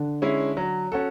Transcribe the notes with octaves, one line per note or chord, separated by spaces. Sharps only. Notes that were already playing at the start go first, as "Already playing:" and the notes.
Already playing: D3 D4
G#3 C#4 E4
F#3
C#4 F#4 A4